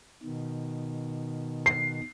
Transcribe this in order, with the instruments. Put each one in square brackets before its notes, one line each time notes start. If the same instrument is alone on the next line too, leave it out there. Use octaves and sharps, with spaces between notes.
[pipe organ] B2 D#3
[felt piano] C7